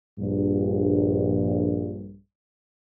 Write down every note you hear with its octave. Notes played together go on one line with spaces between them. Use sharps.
A#1 G2